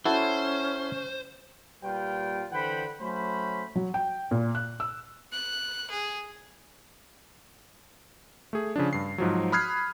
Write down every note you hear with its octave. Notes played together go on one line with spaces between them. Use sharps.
C#4 E4 F#4 A4 C5
A#2 G3 F4 B4 G5
D3 E3 C5 F#5 G5 B5
F#3 A3 C#4 C5 B5
F#3
G5
A#2
F#6
E6
F#6
G#4
A3 G#4
C#3 F3 D4
G2 C7
G#2 F3 F#3
B5 D#6 F6 F#6 G#6 C7